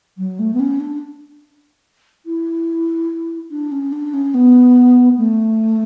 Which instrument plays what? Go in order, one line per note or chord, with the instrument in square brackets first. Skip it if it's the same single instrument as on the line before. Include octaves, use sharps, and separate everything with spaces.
[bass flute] F#3
A3
B3
C#4
D4
E4
D4
C#4
D4
C#4
B3
A3